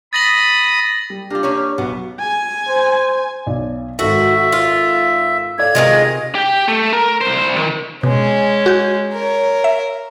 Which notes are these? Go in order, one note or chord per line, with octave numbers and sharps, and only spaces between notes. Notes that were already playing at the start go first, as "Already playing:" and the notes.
B5 D#6 A6 A#6 F#7
G3
A#3 D4 F4 G4
A#3 C#4 C#5
B1 B3
G#5
C5
B1 D5
G#1 F#4 A4 E5
F4
A4 D5 F5 G#6
C3 D#3 G#3 F4 D#5
G4 G5
A3
A#4
C2 C5
D#3
B2 G#3 C#4
F#4 G6
A#4 C#5
E5